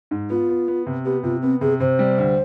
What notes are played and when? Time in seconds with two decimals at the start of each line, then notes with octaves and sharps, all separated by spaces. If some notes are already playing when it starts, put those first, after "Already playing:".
0.11 G#2
0.30 B3 F4
0.49 B3
0.68 B3
0.87 C3
1.05 B3 G4
1.23 C3 F4
1.42 B3 C4
1.61 C3 G#4
1.80 C3 C5
1.99 G3
2.18 D2